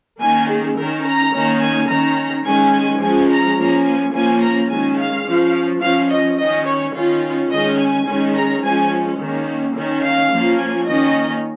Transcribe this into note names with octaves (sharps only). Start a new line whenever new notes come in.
D#3 A#3 C#4 G#5
G#4
D#3 C#4 A#4
A#5
D#3 A#3 C#4
G#5
D#3 C#4 A#5
D#3 G#3 C#4 G#5
F3 G#3 C#4 G#5
A#5
F3 A#3 C#4
G#5
F3 A#3 C#4 G#5
A#5
D#3 G#3 C#4 G#5
F5
F3 C#4
F3 C#4 F5
D#5
D#3 C#4 D#5
C#5
D#3 C#4 F4
D#3 G#3 C#4 D#5
G#5
D#3 G#3 C#4
A#5
F3 G#3 C#4 G#5
D#3 A#3 C#4
D#3 C#4
F5
F3 A#3 C#4
G#5
D#3 A#3 C#4 D#5